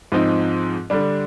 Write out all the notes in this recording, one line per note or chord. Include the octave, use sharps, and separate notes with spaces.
G#2 F3 C4 D#4
D3 G3 D4